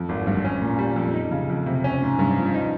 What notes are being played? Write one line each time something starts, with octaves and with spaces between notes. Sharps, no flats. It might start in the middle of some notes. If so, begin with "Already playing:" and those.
Already playing: F2
G#1
G2
C#4
A#2
G3
F2
D#4
C#3
F2
C3
C#4
G#2
G2
F3
D#4